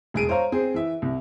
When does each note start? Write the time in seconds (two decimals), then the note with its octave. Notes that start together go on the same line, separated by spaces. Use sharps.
0.14 E1 G#4 D7 D#7
0.29 C5 C#5 F5 A#5
0.52 C4 G#4 C5
0.74 E3 E5
1.02 C2